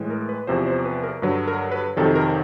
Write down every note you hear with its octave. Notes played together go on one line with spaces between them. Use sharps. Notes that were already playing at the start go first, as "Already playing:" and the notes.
Already playing: A2 E3 G#3
A#4
B4
E2 C3 F3 C5
C5
B4
A#4
G2 D3 F#3 B4
A#4
B4
F2 C3 D#3 F#3 A4
A#4